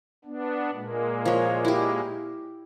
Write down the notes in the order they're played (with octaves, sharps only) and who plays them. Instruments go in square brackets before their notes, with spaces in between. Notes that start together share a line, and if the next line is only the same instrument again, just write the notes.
[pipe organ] B3 D4
A#2 G#3 A#3
[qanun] F3 C#5
E4 G4